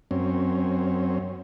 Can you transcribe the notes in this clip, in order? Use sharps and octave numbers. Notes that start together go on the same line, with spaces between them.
F#2 C4 C#4